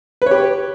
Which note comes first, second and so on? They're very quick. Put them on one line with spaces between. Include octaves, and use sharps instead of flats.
B4 C#5 G4